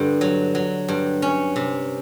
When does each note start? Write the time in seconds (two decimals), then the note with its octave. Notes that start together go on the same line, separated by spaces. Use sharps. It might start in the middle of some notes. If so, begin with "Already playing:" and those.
Already playing: G2 D3
0.21 F#3
0.55 F#3
0.88 G2
1.22 C#4
1.56 C3